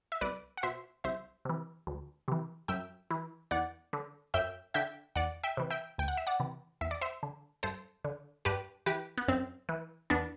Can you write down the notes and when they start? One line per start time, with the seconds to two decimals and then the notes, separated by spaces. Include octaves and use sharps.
0.12 E5
0.21 C2 B4 D5
0.57 F#5
0.63 B2 C5 E5
1.04 C2 C5 E5
1.45 C3 E3
1.87 D2
2.28 C3 E3
2.68 F#2 E5 G5
3.11 E3
3.51 E2 D5 F#5
3.93 D3
4.34 F#2 E5 G5
4.74 D3 E5 G5
5.16 E2 D5 F#5
5.44 E5 G5
5.57 C3 E3
5.70 E5 G5
5.98 D2 G5
6.08 F#5
6.17 E5
6.27 D5 F#5
6.40 C3 E3
6.81 E2 E5
6.91 D5
7.01 C5 E5
7.23 D3
7.63 G2 A4 C5
8.04 D3
8.45 G2 G4 B4
8.86 E3 G4 B4
9.18 B3
9.28 F#2 C4
9.69 E3
10.10 E2 B3 D4